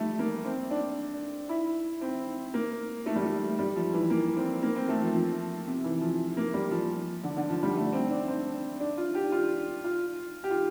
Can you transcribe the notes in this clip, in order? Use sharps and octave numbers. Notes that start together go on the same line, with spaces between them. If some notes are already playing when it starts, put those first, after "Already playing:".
Already playing: F3 G3 A3
A#3
C4
D4
E4
C4
A#3
A3
G3
A3
G3
F3
E3
A#3
C4
A#3
C4
A3
F3
F3
C3
E3
F3
A#3
G3
F3
D3
D3
F3
G3
A3
C4
D4
C4
D4
F4
G4
F4
F4
G4
F4